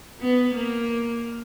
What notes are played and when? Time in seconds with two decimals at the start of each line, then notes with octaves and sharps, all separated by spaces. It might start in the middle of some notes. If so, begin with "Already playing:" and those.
0.21 B3
0.56 A#3